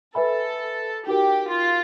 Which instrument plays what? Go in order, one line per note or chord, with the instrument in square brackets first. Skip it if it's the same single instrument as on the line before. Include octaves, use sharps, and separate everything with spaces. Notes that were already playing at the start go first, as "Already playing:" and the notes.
[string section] A4 [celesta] B4 E5 G#5 B5
[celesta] D#4 F#4 A#4 [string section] G4
[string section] F4